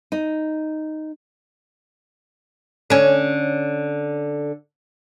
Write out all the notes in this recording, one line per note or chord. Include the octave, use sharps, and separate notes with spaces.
D#4
D3 C#4